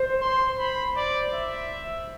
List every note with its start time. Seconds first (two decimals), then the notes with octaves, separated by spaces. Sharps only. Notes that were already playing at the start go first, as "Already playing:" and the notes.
Already playing: C5
0.20 C6
0.58 B5
0.96 D5
1.33 E5